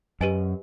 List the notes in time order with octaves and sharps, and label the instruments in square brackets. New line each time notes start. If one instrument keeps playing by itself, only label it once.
[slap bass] F#2 [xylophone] G4 B4 D#5 G#5